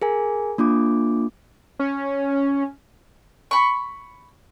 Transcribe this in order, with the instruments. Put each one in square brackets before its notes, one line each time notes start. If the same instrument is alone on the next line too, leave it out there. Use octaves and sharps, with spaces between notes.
[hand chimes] G#4 A#4 G#5
A#3 D4 F4 D6
[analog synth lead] C#4
[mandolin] B5 C#6